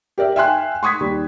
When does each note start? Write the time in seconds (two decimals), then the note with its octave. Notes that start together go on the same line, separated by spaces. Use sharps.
0.18 G4 A#4 D5 E5
0.36 E5 F5 G5 G#5 C6 F#6
0.83 C6 C#6 D#6 G#6 B6
1.00 D#2 G3